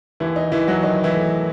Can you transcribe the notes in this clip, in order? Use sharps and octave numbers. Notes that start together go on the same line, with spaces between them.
D#2 E3 E4
D#4
D#2 E3 E4
F#3 F#4
D#3 D#4
E3 E4
A3